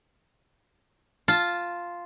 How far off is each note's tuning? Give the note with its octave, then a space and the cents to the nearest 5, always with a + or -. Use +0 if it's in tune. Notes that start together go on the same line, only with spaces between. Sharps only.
F4 +0 A5 +0